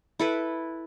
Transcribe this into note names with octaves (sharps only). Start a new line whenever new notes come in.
E4 A4 B4